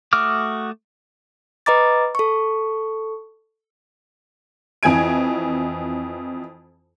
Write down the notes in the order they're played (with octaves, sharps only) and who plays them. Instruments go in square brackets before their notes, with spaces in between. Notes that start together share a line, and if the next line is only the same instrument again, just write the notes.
[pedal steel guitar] A3 F#4 D6 D#6 F6
[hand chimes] B4 D#5 A#5 D6 A6
A4 C#6
[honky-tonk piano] F2 E3 G#5 G#6 D7